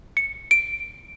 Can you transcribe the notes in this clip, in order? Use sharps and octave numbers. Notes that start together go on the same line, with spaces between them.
C#7
D7